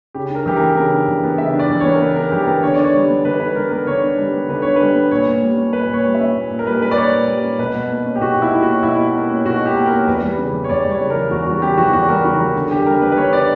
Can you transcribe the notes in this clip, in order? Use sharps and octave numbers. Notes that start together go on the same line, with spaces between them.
C#3 G4
D4 A#4
E3 G4
A#4
B3
C#3 A#4
D4
E3
B3
C#3 E5
D4
D5
E3
C#5
B3
A#4
C#3 B4
D4 A#4
E3 G4
B3 A#4
D3 C#5
D4 D5
C#5
G3
B3
D3 B4
D4 B4
G3 A#4
B3 A#4
D3 C#5
D4
G3
B3
D3 B4
D4 C#5
G3 B4
B3
A#2 C#5
A#2
G3
C#4
A#2 B4
A#2
C#5
G3
E5
C#4
A#2
A#2
A#4
G3 B4
C#4 B4
D5
A#2 C#5
A#2
G3
C#4
B2 B4
B2
A#3
C#4
G4
B2 F#4
B2
E4
A#3
F#4
C#4
B2 E4
B2
A#3
C#4
B2 F#4
B2
G4
A#3
A#4
C#4
E2 B4
G3
C#3
E3
C#5
E2 D5
G3
C#5
C#3
A#4
E3
E2 F#4
G3 F#4
C#3 G4
E3 F#4
E2 F#4
G3 A#4
C#3 F#4
E3 A#4
D3
D3 G4
G3 A#4
B3 B4
B4
D3 C#5
D3 D5